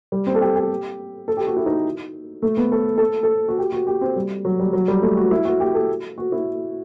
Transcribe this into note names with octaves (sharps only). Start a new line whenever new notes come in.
G3
C4
A4
G4
G4
A4
G4
F#4
E4
D#4
A3
B3
A4
A4
A4
F#4
G4
F#4
G4
C4
G3
F#3
G3
F#3
G3
A3
F#4
E4
F#4
G4
A4
F#4
E4